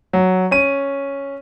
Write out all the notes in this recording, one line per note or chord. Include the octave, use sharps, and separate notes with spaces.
F#3
C#4 D#7